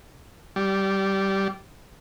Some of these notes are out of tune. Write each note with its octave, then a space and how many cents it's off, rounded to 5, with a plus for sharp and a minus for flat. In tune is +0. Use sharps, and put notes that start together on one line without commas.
G3 -15